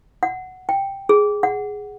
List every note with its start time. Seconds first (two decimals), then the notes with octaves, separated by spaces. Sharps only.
0.23 F#5
0.69 G5
1.09 G#4
1.43 F#5